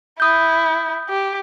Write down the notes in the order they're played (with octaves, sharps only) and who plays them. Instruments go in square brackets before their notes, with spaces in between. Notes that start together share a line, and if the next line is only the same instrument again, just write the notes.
[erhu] E4 [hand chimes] D#6 G6
[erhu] G4